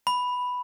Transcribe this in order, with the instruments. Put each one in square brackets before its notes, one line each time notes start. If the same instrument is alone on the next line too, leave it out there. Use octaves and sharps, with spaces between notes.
[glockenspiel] B5